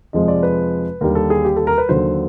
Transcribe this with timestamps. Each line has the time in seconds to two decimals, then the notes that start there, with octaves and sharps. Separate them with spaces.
0.13 F2 C3 F3 G#3 D#5
0.28 D5
0.43 B4
1.01 D#2 D3 G3 A#4
1.15 A4
1.30 G#4
1.45 G4
1.56 A4
1.67 A#4
1.78 B4
1.89 D#2 D3 F#3 C5